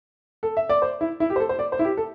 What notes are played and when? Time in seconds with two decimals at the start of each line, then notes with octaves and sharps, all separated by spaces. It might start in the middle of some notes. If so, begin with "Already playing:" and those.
0.43 A4
0.57 E5
0.69 D5
0.82 C5
1.01 E4
1.20 E4
1.30 G4
1.36 C5
1.40 A4
1.49 C5
1.59 D5
1.72 C5
1.79 E4
1.84 G4
1.97 A4